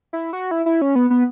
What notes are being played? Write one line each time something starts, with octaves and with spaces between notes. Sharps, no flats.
E4
F#4
E4
E4
C#4
B3
B3